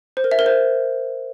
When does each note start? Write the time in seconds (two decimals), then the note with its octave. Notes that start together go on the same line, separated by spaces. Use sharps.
0.17 C5
0.24 A#4
0.31 E5
0.39 A#4
0.46 C5